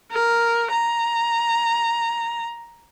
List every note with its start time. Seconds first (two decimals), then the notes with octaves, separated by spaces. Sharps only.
0.12 A#4
0.72 A#5